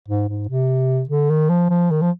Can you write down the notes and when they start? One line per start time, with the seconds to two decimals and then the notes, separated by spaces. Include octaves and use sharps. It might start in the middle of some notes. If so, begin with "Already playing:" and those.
0.08 G#2
0.29 G#2
0.48 C3
1.09 D3
1.30 D#3
1.49 F3
1.70 F3
1.91 D#3
2.02 F3